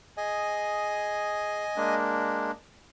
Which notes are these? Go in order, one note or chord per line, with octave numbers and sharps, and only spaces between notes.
G#4 D#5 G#5
G#3 A#3 D4